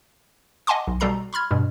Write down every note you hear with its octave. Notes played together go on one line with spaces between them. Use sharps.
D#5 F#5 G#5 A5 C6 D6
B1
B2 G3 A4 A#5 C7
B5 C6 F6 G#6
G2 B2 G3